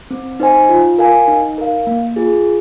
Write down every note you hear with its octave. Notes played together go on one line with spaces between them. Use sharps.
C4
D#4 C5 G#5
F4
A#4 F5 G#5
D#4
A#4 F5
A#3
F4 G#4